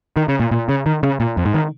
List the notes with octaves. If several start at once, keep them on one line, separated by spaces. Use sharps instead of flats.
D#3
C#3
A#2
A#2
C#3
D#3
C#3
A#2
F2
G#2
D#3